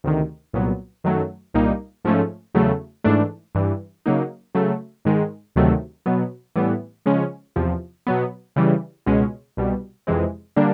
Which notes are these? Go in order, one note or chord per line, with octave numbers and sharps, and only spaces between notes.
D2 C3 D#3
C2 A#2 F#3 B3
F#2 D#3 F#3 A3
C2 A#2 G3 A#3 D#4
G#2 F3 A3 C#4
E2 C#3 F#3 A3
G#2 E3 A3 D4
G2 E3 G3
C#3 F#3 A#3 D#4
C#3 F#3 A3
G#2 D#3 G#3
D2 C3 D#3 F#3 A3
B2 F#3 B3
A2 E3 G3 B3
C#3 F3 G#3 C#4
E2 C3 F3
B2 F#3 B3
C#3 E3 G3
C#2 B2 G#3 C#4
C2 B2 G3
F2 C3 E3 G#3 C4
D3 G3 A#3 D4